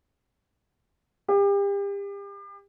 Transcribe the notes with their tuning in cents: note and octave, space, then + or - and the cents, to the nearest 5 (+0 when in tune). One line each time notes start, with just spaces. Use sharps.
G4 +35